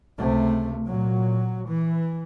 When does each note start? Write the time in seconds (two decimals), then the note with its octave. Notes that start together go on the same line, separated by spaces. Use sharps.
0.18 C#2 C3 A3
0.88 A#2 F#3
1.69 E3